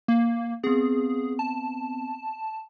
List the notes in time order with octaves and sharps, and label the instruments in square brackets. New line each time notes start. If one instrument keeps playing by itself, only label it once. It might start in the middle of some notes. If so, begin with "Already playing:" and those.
[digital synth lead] A#3
[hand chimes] B3 C4 [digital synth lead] G#4
[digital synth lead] A5